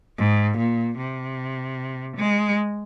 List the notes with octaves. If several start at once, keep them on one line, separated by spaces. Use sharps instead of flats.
G#2
A#2
C3
G#3